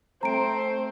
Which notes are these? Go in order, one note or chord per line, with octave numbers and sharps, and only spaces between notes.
A3 C4 C5 A#5 D7